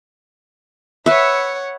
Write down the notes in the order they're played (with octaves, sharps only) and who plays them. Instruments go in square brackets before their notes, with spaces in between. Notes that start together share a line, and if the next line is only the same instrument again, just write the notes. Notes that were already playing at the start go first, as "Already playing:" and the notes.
[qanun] B4 E5 [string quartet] C#5 F#5